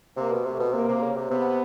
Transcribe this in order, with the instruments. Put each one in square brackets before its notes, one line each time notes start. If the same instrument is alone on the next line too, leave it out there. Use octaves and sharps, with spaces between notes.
[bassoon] C3 [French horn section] A#3
[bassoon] B2
[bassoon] C3 [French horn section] A3
[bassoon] B2
[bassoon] C3 [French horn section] A#3
[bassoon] C3
C#3
C3
[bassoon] C3 [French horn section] B3